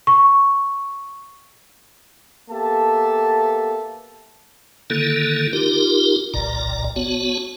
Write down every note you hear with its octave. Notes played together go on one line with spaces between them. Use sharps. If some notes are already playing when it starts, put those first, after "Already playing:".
C#6
A#3 B3 G4 A4 E5 A5
D3 D#3 A#3 E4 A4
D#4 F4 G4 A#4
G1 C2 A#2 D5 A#5
B3 F#4 C#5 A5